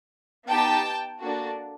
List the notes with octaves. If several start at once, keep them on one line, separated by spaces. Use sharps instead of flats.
B3 D#4 G4 G5 A5
A#3 D4 F#4 A4